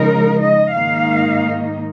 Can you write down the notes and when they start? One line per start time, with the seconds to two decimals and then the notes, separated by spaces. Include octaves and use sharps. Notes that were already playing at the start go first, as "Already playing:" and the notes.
Already playing: C#3 F3 G#3 D#4 A#4
0.42 D#5
0.74 G#2 D#3 A#3 D#4 F5